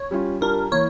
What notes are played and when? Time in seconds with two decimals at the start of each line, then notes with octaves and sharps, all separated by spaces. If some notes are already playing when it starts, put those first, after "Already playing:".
Already playing: C#5
0.11 G3 C#4 F4
0.41 G3 D4 F4 A#4
0.71 E3 A#3 E4 C#5